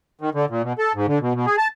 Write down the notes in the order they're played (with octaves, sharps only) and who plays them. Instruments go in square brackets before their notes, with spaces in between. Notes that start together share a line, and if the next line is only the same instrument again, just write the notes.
[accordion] D#3
D3
A#2
B2
A4
G#2
D3
B2
B2
G#4
A5